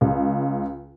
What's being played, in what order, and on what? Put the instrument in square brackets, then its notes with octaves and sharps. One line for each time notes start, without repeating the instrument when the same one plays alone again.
[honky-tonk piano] C#2